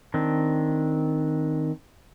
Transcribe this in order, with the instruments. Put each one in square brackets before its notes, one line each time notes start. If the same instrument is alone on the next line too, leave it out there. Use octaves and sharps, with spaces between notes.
[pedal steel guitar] D#3 C4 D4